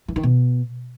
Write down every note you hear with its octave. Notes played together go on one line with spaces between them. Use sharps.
E3
D#3
B2